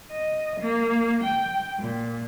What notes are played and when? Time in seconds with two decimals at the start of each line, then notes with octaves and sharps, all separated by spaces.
0.12 D#5
0.60 A#3
1.24 G5
1.80 A#2